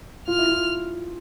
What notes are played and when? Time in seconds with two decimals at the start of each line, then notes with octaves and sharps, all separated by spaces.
0.28 F4 F6
0.39 E4
0.49 F4